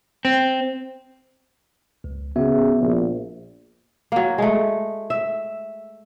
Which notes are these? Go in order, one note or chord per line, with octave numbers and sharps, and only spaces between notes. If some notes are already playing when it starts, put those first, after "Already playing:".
C4
C#2
C#3 B3 F#4 E5
A#1
F#3 A#3
G#3 A3
E5